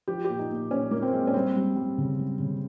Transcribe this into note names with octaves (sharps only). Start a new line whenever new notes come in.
F3 G4
G4
A#2
D#4
A#2
A#2 C#4
A#2 A#3
C4
G#3
C#4
G3 C4
G3
G3
C#3
G3
C#3